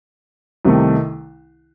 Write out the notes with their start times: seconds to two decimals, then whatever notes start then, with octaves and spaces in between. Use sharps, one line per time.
0.65 C2 C3 D#3 A3